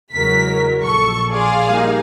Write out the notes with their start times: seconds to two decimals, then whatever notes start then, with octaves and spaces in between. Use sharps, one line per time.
0.13 E2 C#3 F#3 G#3 A#4 B6
0.83 A#1 A4 C#6
1.33 G#4 D5 F5 C6
1.68 G3 A#3 D#4